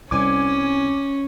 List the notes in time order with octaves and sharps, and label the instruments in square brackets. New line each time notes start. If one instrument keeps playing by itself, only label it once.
[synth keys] C2 G#5 [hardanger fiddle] C#4 [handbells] D6